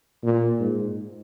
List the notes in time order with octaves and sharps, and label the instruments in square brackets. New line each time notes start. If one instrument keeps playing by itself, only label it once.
[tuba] A#2
G#2